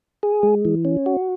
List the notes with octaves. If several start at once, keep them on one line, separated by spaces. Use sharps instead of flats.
G#4
G#3
E3
C#4
F#4